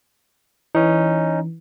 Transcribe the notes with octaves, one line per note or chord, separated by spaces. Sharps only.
E3 C#4 D#4